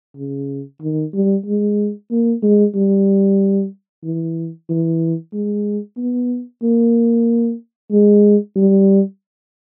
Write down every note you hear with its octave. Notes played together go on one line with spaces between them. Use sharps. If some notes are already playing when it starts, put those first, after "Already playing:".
C#3
D#3
G3
G#3
A#3
G#3
G3
E3
E3
G#3
B3
A#3
G#3
G3